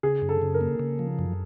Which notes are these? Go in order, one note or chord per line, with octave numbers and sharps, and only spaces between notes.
C#3 G#4
F#2
A4
C#3
A#4
A#3
C#3
F3
F#2